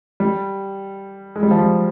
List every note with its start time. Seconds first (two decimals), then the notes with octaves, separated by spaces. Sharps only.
0.20 G3
1.36 G#3
1.43 G3
1.51 F3
1.59 G3